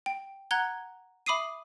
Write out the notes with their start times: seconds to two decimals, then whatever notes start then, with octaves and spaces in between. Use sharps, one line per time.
0.06 G5
0.51 F#5 A#5 F#6 G#6 G7
1.26 E5 B5 D6 D#6 C7 D#7